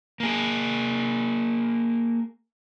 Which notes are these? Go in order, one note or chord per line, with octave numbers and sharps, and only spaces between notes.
A#3 G#4